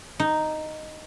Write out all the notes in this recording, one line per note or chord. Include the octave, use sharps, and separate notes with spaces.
D#4